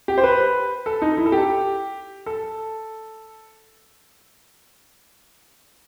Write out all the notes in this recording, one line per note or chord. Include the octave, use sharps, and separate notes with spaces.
G4
C5
B4
A4
D#4
E4
A4
G4
A4